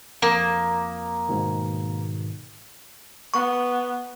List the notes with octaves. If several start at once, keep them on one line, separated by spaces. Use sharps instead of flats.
F2 A#3 D6 D#6
G#2 B2 D#3
B3 C#6